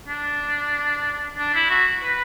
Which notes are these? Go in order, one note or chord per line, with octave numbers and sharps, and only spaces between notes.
D4
D4
E4
F#4
B4